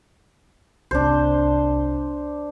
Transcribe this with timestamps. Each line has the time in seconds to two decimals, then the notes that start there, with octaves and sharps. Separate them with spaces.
0.91 G1 C2 C3 D4 C5